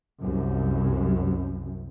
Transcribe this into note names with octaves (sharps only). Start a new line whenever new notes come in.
C2 F#2